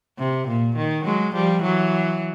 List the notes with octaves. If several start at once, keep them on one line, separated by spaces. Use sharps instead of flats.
C3
A#2
D#3
F#3 G#3
F3 G3
E3 F#3